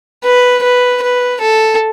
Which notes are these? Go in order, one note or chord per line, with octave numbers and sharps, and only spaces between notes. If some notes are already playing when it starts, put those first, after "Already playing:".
B4
B4
B4
A4